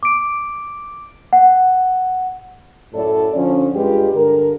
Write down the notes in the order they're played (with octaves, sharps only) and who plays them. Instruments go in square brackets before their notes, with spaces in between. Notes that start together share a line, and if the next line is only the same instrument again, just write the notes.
[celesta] D6 D7
F#5
[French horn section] F#2 A2 E4 A4 D5
D3 F3 C#4
G2 G#3 F4 G4 B4
G2 D3 A#4